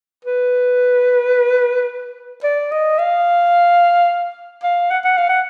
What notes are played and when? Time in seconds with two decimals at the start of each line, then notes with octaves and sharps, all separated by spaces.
0.25 B4
2.44 D5
2.71 D#5
2.98 F5
4.63 F5
4.90 F#5
5.05 F#5
5.18 F5
5.29 F#5